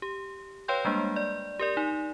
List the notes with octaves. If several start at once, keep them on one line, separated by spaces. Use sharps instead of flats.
G4
B4 C#5 F5 G5 C6 G6
G3 G#3 A#3 D4
D5
G4 A#4 D5
D#4